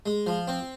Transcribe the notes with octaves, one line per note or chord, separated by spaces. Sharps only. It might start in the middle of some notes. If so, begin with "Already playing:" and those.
G#3
F3
C4